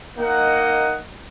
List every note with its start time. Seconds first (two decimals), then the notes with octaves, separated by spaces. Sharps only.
0.18 A#3 D#4 D#5 F#5